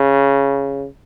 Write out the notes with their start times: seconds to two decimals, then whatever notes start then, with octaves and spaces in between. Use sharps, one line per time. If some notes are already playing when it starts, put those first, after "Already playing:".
Already playing: C#3